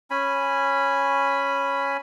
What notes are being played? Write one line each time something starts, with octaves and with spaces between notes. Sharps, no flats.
C#4 G#5 B5